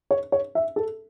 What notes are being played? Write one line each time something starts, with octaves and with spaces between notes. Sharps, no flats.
C#5
C#5
E5
A4